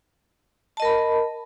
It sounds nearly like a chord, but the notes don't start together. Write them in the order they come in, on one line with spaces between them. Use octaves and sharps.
A5 D#5 A#4 B5